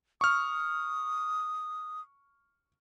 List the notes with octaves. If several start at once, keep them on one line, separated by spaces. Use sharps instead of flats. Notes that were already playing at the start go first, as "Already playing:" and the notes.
C#6 D#6 F6